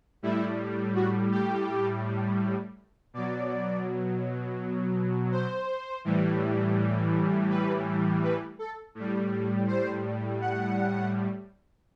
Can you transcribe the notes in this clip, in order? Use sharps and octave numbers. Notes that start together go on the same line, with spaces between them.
A2 G3 E4
F#4
G4
B2 F#3 D5
C5
A2 E3 G3
B4
B4
A4
A2 G3
C5
F#5